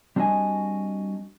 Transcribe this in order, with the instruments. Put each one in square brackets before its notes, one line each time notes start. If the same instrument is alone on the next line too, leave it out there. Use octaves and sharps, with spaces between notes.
[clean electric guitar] G3 C4 D4 F#4 D#5 G#5